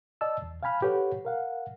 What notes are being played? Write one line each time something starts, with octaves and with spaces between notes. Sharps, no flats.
D5 D#5 A5 E6
E2
F5 G5 G#5 B5 F6
G4 A4 B4 C#5 F#5
A#4 F5 F#5